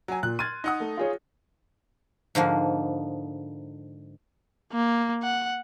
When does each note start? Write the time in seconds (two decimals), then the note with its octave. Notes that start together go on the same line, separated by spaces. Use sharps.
0.08 F#3 G#5
0.23 A#2 F#6
0.39 C6 F6 G#6 A6 D#7
0.64 D#4 F#5 D#6
0.80 A3
0.97 F4 G#4 C#5
2.35 G#2 D3 F3 A#3
4.72 A#3
5.23 F#5